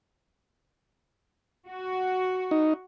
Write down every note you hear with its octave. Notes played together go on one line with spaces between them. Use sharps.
F#4
D#4